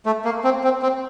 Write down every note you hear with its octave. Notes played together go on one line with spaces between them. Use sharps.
A3
A#3
C4
C4
C4